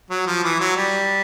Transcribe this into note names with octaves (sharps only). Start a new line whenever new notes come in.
F#3
F3
E3
F#3
G3